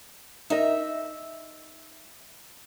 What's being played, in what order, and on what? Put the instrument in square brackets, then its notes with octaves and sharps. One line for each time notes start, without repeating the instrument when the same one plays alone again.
[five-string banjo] D#4 A#4 D#5 [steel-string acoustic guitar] E5